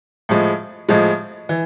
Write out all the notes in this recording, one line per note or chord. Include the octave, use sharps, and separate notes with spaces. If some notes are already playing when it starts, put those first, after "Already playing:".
A2 F3 G#3
A2 F3 G#3
E3